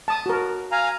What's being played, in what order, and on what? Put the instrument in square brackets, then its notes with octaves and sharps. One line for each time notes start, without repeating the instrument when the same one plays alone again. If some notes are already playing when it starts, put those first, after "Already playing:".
[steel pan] A5 D#6
F#4 A#4
[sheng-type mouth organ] F5 G#5 A#5